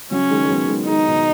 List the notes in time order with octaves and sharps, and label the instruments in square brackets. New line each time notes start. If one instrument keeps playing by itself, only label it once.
[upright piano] C#3 F#3 [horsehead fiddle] C#4
[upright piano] D#3 G#3
G#3
F#3 B3
D#3 G#3
[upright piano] D#3 G#3 [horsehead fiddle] D#4
[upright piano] B2 D#3